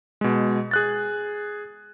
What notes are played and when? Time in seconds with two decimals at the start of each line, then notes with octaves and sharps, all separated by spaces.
0.21 B2 G#3
0.71 G#4 F#6 A6